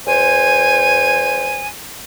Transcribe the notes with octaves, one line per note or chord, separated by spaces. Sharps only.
E2 C5 G#5